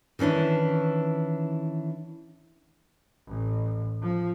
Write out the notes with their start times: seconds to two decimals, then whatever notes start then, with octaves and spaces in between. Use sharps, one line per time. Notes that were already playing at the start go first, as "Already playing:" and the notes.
0.19 D#3 E3 C#4 D4 E4
3.27 A1
4.01 F3